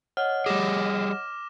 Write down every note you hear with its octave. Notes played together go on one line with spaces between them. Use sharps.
C#5 D#5 F#5 F6
G3 G4 G#4 D6 A#6 E7